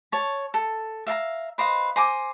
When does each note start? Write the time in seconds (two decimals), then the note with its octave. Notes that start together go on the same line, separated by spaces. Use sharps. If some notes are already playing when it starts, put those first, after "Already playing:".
0.12 C#5 A5
0.54 A4
1.07 E5 F5 A5 A#5
1.58 B4 C5 D#5 F5
1.96 C5 G#5 A#5 D6